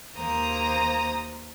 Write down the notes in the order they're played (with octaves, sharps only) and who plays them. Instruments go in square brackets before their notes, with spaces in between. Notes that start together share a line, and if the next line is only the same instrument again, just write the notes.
[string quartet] D#2 A#3 C5 A#5 D#6